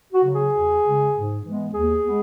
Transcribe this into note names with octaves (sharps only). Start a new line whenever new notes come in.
F#4
C#3 F#3
G#4
E2
C#3 G#3
G#2
E3 G#3 B3
D#2 G#4
G#3 B3